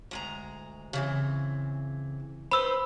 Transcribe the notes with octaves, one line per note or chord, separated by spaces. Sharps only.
D2 G#3 A#5
C#3 E3 C4
D#4 B4 C5 B5 E6